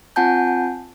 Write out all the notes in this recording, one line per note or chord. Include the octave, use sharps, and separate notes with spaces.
C4 F4 F#5 G#5 A5 G6